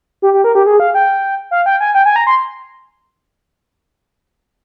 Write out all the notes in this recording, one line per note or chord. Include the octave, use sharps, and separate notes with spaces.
G4
G4
A#4
G4
G#4
F5
G5
F5
G5
G#5
G5
G#5
A#5
C6